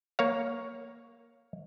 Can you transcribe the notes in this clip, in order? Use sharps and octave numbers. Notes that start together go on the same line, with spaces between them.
A#3 C#5 F5